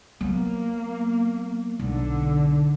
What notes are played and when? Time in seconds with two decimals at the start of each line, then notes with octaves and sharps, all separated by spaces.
0.21 F#3 A#3 B3
1.80 B1 D3